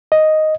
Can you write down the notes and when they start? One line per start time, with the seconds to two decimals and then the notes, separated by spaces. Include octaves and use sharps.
0.12 D#5